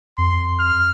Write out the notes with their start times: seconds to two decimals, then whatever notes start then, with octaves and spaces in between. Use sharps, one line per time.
0.18 F2 C6
0.59 F6